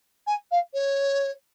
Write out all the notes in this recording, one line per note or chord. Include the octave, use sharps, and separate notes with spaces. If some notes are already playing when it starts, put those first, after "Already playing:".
G#5
F5
C#5